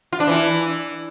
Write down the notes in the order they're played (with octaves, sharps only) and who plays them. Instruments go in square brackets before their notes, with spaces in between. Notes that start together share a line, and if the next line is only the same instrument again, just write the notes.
[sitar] F4
D4
E3